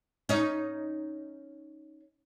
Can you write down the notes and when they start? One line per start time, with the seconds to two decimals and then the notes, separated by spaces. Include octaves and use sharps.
0.29 C#4 D#4